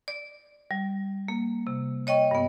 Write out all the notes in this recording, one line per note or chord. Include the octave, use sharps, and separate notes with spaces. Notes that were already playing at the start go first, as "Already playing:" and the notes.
D5
G3
A#3
C3
C#5 D#5 G5 C#6
G2 B3